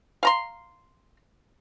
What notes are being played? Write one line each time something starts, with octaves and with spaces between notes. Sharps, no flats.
F5 A#5 C6